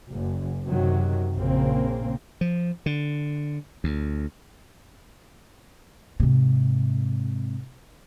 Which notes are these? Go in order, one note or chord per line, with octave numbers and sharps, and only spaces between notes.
F#1 F#2
F#2 C3 D#3 F#3
A#1 C#3 A#3 C4
F3
D3
D2
G#2 C3